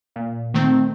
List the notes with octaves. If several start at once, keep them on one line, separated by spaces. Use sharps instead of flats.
A#2
D#3 A3 C4